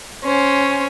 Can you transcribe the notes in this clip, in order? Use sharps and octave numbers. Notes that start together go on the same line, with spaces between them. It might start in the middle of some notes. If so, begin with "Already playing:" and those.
C#4 C5